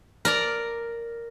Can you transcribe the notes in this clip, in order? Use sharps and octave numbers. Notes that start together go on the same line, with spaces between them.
A#4 D5 A#5